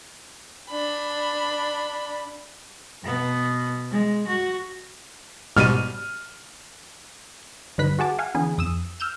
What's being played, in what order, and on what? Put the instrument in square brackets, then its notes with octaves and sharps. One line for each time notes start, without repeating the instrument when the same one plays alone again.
[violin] D4 B5
[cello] B2 B3
G#3
F#4
[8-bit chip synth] G#2 B2 G3 [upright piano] F6 D#7
[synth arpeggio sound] G2 D3 D#4 B4 F#6 B6
F#4 G#4 F#5 A5 D6
F5 F#5 G#5
D3 E3 B3 G#4
F2 D#6 E6 E7
E6 F6 G6 E7